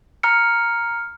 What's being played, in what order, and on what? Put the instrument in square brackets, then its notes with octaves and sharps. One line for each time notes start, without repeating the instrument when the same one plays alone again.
[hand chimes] A#5 F6 C#7